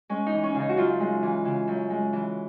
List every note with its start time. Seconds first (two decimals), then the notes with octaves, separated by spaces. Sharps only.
0.09 G#3 C#4
0.26 D#4
0.32 E3
0.44 C#4
0.55 C#3
0.60 D#4
0.69 F#4
0.77 F#2 F4
1.00 G#3
1.23 E3
1.45 C#3
1.68 F#2
1.90 G#3
2.13 E3